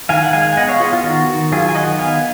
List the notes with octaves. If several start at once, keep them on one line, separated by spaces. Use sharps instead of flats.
D#3 F5 G#5
F#5
G#3 F5 G#5
G#5
B3 D#5 F#5
C#5 F5
B3 F4 G#4
F4
D#3 F#4
D#3
F#3 F4 G#4
G#5
D#3 D#5 F#5
B3 F5 G#5